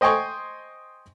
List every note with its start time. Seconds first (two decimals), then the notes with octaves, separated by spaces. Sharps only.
0.01 C5 D#5 G5 G#5 C#6